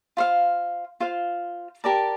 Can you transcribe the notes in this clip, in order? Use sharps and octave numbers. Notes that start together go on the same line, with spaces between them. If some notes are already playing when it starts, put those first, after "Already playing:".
F4 C5 F5
F4 C5 F5
G4 A#4 D5 A5